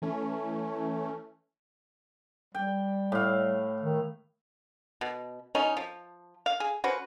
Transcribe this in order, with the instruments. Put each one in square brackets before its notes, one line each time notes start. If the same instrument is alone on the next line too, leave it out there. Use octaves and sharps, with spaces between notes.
[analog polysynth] E3 A3 C#4
[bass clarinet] G3 [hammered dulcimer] G5
[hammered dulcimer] A2 F5
[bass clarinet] D#3
[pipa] B2
B2 C#4 D#4
F3
F5
G#4
C#4 F#4 B4 C5